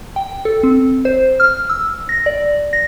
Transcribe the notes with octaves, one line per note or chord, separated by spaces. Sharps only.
G5
A4
C4
C5
F6
E6
A#6
D5
A#6